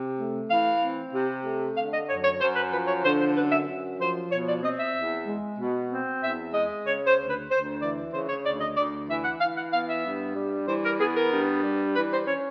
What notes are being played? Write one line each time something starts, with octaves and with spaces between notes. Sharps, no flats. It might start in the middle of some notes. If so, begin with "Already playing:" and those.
Already playing: C3
A3
E3 F5
C4
C3
A3
D3 F5
D#5
F#2 C#5
C#5
F#2 C5
B4
F3 B4
C#5
D3 C5
C5
F#2 B4
E5
F#2
F3 C5
B2 C#5
D5
C4 D#5
E5
E2
G#3
B2
C4
E2 E5
G#3 D#5
C#3 C#5
C5
D2
B4
D2 C5
E3 D5
C#3 C5
C#5
D2 D5
D#5
D2 D5
E3 E5
F#5
E3 F5
F#5
B3 F5
E5
G2
G3
E3 C5
A#4
B3 G#4
A#4
G2
G3
E3 B4
C5
C#4 C#5